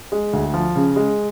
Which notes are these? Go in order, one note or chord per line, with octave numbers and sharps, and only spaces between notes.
G#3
D2
F3
C#3
G#3